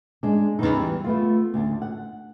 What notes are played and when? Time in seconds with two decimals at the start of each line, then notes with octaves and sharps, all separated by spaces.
0.23 G#3 D4
0.59 E2 G2 C#3 E3 D#4
0.73 E3 G3
1.04 A3 B3 F4
1.54 D2 D4
1.82 F#5